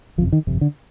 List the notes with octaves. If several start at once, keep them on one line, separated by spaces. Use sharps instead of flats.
G1 F2 C3 F3
D#3
G1 F2 C3
D3